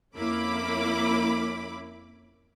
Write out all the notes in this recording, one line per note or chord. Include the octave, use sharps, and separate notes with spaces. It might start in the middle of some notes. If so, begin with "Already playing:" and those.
F2 A#3 C#4 E4 B5 D6